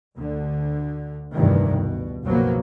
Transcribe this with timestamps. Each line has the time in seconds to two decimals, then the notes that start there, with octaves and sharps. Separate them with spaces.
0.15 D2 D3
1.33 F1 D2 G2 A#2 D#3 E3
1.72 B2
2.24 F#1 B1 F3 F#3 A#3 B3